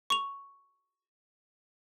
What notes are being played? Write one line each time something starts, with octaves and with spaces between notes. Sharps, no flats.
C#6 F7